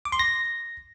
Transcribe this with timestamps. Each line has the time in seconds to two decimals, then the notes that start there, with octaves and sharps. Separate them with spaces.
0.05 D6
0.12 C6
0.19 A#6